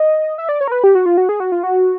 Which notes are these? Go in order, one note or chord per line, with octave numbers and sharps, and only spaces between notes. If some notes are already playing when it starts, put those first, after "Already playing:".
Already playing: D#5
E5
D5
C#5
A#4
B4
G4
F#4
F4
F#4
G#4
F#4
F4
F#4